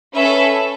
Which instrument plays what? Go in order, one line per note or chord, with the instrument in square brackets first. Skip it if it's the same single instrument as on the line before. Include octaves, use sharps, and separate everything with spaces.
[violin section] C#4 A4 B4 E5